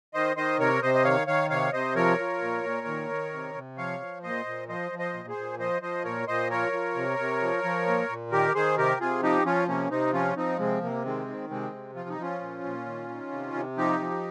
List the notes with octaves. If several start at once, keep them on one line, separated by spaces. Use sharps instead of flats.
D#3 C5 D#5
D#3 C5 D#5
C3 A#4 C#5
C3 C5 D#5
D#5
D#3 C#5 F5
D#3 C#5 F5
C3 C#5 F5
C3 C5 D#5
F3 A#4 C#5
F3
A#2
A#2
D#3
D#3
C3
C3
F3 C#5 F5
F3
A#2 C5 D#5
A#2
F3 C5 D#5
F3
C5 D#5
A#2
G#4 C5
A#2
F3 C5 D#5
F3 C5 D#5
A#2 A#4 C#5
A#2 C5 D#5
F3 A#4 C#5
F3
C3
C3
F3
F3
A#2
A#2
D#3 G4 A#4
D#3 G#4 C5
C3 G4 A#4
C3 F4 G#4
F3 D#4 G4
F3 C#4 F4
C3 A#3 C#4
C3 C4 D#4
F3 C#4 F4
F3 C4 D#4
C3 G#3 C4
C3 A#3
D#3 G#3 C4
D#3
C3 G#3 C4
C3
F3 F4
D#4
F3 C#4 F4
A#2
A#2
D#3
D#3
C3
C3
F3 D#4 G4
F3